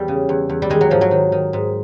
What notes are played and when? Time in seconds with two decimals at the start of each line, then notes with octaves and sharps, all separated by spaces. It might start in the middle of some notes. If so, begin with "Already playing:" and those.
Already playing: E2 E3 G3
0.08 C#3
0.29 E2
0.49 E2
0.62 G3
0.70 D#3 G#3
0.81 F#3
0.90 G#2 F3
1.01 F#3
1.11 D#3
1.32 D#3
1.53 G#2